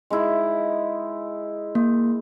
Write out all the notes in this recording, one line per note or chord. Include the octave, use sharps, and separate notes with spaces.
G#3 D#4 E4
A#3